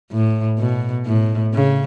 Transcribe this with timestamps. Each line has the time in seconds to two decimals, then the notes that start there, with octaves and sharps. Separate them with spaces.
0.11 A2
0.59 B2
1.06 A2
1.54 C#3